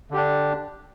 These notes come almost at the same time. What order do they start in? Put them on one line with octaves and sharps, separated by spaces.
D3 G4 D4